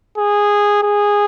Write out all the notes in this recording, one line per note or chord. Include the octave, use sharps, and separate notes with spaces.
G#4
G#4